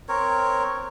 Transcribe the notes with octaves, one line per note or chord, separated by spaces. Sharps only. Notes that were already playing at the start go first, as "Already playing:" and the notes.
C4 A#4 C#5